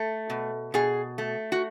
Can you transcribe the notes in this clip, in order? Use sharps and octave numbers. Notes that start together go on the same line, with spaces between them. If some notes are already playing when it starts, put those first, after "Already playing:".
Already playing: A3
B2
B2 G#4
A3
F#4